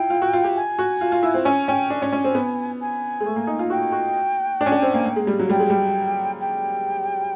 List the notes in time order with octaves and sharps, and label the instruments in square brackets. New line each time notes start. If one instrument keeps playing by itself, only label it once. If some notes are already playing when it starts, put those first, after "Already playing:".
Already playing: [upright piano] E4 F4 [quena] G5
[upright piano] F4
F#4
F4
G4
[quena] G#5
[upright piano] F#4
F4
F4
E4
C4
[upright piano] C#4 [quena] G#5
[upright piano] C#4 [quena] G5
[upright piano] D4 [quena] G#5
[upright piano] C#4
C#4
C4
B3
[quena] G#5
[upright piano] G#3
A3
A#3
D#4
F4
[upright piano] F#4 [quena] G5
[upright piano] F#4
D4
C#4
D4
C4
A#3
A#3
G#3
G3
F#3
[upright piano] G3 [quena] G5
[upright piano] G#3
G3
[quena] G5